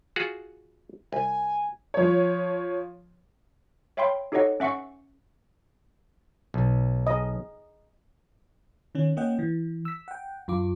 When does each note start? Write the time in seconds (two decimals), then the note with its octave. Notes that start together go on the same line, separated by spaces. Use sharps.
0.16 F4 F#4 G#4
1.13 C2 G#5
1.94 F3 C#5
3.97 C#5 E5 F5 G5 B5 C6
4.32 D#4 G4 A4 C#5 D#5 F#5
4.60 C#4 E5 F#5 C#6 C#7
6.54 B1
7.07 D#5
8.95 D#3 C#4
9.17 A#3 C#4 D#5 F#5 G5
9.39 E3
9.85 E6 B6
10.08 F#5 G5
10.48 F#2 F4 D6